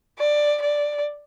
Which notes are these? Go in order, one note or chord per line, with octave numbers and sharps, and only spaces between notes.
D5
D5